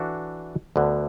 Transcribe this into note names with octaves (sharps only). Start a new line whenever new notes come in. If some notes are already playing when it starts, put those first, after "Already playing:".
Already playing: E3 D4 F#4 A4 D5
D2 D3 B3